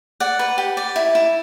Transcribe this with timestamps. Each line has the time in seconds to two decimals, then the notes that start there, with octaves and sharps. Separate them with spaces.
0.20 D5 F#5
0.39 B4
0.58 G4
0.77 D5
0.96 E4
1.15 E4